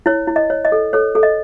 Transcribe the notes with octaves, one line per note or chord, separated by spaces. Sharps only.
E4 C#5
E4
D#5
C#5
D#5
A4
A4 C#5
A4
D#5